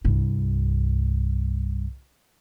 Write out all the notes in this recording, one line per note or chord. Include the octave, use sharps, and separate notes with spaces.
C2 G2